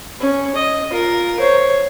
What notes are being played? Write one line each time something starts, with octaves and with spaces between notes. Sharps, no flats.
C#4
D#5
F4 A#4
C5 C#5